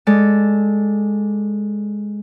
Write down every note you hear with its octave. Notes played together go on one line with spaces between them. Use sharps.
G#3 A4 D5